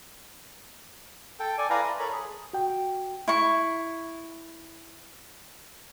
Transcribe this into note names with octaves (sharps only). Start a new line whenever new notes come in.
A4 G5
A4 D5 G#5
E4 B4 D5 F5 G#5 A#5
C6
A4 A#4 C#5 B5
G#4
F#4 G5
E4 C#6